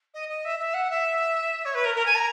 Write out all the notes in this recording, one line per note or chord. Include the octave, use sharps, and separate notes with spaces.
D#5
D#5
E5
E5
F#5
E5
C#5
B4
A#4
A#4
G#5
A#5